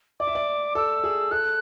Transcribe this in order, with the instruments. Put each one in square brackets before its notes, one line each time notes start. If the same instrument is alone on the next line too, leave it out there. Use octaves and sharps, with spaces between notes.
[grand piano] D5 [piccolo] D6
[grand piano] E5
D5
[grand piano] A4 [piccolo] E6
[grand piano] G#4
[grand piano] A4 [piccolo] F#6